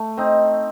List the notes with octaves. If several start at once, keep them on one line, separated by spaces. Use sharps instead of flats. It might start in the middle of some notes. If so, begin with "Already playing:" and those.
Already playing: A3
C4 D#4